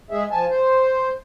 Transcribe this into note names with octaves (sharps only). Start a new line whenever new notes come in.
G#3 G#4 E5
F3 G#5 A5
C5